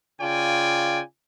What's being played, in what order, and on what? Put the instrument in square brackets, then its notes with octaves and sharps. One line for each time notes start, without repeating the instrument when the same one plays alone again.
[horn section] C#3 F4 D5 G5 G#5